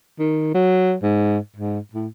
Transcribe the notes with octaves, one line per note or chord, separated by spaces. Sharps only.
D#3
F#3
G#2
G#2
A2